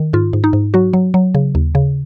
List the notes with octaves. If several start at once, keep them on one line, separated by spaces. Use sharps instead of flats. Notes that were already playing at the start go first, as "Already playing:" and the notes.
Already playing: D#3
G#2 F4
G#2
D#4
G#2
F#3 F#4
F#3
F#3
C#3
D#2
C#3